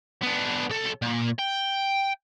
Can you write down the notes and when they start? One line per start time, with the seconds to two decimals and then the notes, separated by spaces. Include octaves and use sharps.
0.22 B3 D4
0.70 B1 A4
1.02 A#2
1.39 G5